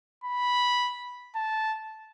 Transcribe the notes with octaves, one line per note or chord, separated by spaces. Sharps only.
B5
A5